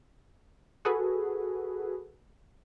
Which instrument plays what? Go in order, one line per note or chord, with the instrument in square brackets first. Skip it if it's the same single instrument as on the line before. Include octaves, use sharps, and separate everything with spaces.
[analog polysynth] F#4 G#4 A4 B4